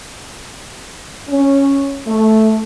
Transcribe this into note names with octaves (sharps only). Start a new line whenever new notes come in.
C#4
A3